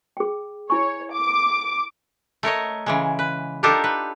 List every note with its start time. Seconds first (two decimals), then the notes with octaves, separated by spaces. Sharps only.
0.17 G#4 G5
0.70 E4 C#5 G#5 C#6
1.13 D6
2.43 A3 A#4 C#5 D#5
2.86 C#3 E3 G#3
3.19 B4
3.63 D4 D#4 F4 G4 A4 A#4
3.84 B4